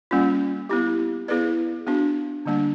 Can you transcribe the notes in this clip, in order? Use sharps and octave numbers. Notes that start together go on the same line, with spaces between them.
G3 A#3 C#4 F4
B3 E4 G4
B3 E4 G#4 B4 D5
B3 D4 F#4
D3 G3 A#3 D4